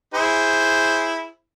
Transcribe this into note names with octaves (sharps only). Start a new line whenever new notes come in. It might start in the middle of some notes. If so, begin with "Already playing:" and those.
E4 G#4 C5